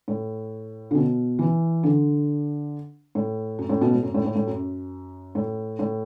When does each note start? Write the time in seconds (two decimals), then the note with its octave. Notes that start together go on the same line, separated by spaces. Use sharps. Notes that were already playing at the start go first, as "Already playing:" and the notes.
0.08 A2
0.91 D3
0.95 B2
1.39 E3
1.83 D3
3.15 A2
3.59 F#2
3.69 A2
3.81 B2
3.92 A2
4.03 F#2
4.14 A2
4.24 A2
4.36 A2
4.47 F#2
5.35 A2
5.79 A2